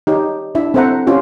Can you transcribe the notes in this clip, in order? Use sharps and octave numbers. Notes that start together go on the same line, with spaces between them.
D#4 G4 C#5
D4 E4 E5
C4 A4 C5 E5 F#5 A#5
C#4 F4 G4 C5